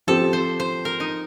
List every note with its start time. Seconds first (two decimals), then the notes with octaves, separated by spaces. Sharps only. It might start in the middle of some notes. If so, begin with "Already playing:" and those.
0.07 F3 C4 G4 A4
0.33 C5
0.60 C5
0.85 A#4
1.00 D#4